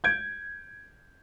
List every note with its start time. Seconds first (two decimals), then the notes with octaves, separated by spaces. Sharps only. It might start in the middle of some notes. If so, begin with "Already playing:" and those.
0.04 G6 G#6 D7